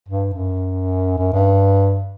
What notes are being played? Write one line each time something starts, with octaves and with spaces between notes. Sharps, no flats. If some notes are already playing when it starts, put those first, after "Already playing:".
G2
F#2
F#2
G2